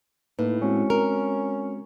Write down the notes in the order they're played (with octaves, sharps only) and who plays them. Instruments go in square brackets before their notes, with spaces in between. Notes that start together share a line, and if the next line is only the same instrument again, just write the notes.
[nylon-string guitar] A2 [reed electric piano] A#3 D#4 B4
[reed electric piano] G#3 C4 F#4 [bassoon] C#4
[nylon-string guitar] A#4